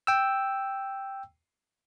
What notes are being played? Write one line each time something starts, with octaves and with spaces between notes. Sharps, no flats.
G5 E6